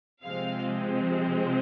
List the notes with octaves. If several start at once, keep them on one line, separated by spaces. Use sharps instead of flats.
C3 F3 G#3 C4 F5